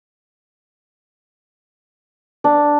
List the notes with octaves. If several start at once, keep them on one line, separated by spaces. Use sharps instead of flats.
D4